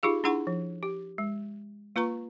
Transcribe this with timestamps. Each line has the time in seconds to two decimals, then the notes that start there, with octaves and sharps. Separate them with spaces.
0.03 D#4 F4 G4 G#4 F5
0.24 D4 E4 G#4 F#5 C6 C#6
0.47 F3
0.83 G4
1.18 G#3
1.96 A#3 F4 B4 A#5 C#6